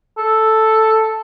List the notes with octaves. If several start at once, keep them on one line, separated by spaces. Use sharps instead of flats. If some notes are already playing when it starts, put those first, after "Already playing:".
A4